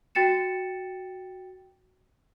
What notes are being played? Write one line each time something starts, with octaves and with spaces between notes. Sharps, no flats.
F#4 G5 A6 C#7 E7